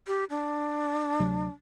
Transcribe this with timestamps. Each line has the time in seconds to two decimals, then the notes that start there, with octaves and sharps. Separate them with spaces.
0.07 G4
0.30 D4
1.19 D2 C3 F#3